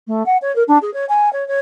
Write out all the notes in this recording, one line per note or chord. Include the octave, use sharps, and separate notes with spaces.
A3
F#5
C#5
A#4
D4
G#4
C#5
G#5
C#5
C#5